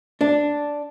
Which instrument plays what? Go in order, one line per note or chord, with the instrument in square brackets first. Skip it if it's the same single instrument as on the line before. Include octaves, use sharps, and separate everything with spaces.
[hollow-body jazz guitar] D4